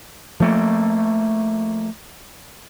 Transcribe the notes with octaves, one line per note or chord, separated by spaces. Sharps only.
F3 A3 A#3